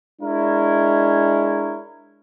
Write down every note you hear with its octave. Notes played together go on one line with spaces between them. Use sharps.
G#3 D4 E4 A#4 C#5